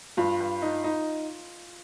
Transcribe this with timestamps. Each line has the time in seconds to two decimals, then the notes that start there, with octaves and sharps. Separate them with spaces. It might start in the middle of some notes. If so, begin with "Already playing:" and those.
0.17 G2 F4
0.40 G2
0.62 D#4
0.84 D#4